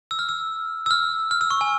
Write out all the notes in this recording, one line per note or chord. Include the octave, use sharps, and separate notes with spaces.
E6
F6
E6
E6
F6
F6
E6
C#6
G#5